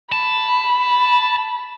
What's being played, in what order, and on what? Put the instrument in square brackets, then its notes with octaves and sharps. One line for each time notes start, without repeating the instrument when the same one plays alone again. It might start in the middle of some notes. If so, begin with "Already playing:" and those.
[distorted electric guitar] A5 [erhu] B5